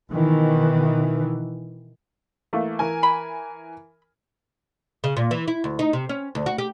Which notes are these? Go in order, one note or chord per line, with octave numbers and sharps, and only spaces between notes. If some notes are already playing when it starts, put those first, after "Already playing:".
B2 D#3 E3
E3 A3 A#3
E3 A#4 G#5
B5
C#3
A#2
E3
E4
D2
D#4
C3
C#4
D2
F#4
G4